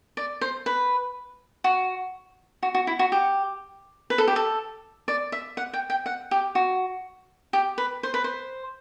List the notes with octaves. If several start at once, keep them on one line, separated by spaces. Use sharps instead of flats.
D5
C5
B4
F#4
F#4
F#4
E4
F#4
G4
B4
A4
G4
A4
D5
E5
F#5
G5
G5
F#5
G4
F#4
G4
B4
C5
B4
C5